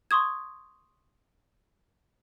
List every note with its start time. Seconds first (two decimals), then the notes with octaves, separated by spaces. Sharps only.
0.11 C6 C#6 D#6 G#6